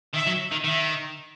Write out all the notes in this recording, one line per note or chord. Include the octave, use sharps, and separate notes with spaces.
D#3 E5
F#3
D#3
D#3 E5